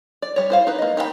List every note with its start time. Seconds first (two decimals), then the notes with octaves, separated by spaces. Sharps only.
0.22 D5
0.36 G3 C#5
0.50 E4 C5 F5
0.67 D#4 B4
0.78 A#3 D#5
0.97 D#4 G4 F5 B5